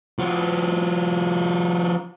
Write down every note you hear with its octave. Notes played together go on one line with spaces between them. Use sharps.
F3 F#4